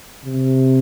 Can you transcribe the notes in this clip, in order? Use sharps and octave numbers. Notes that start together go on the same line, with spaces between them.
C3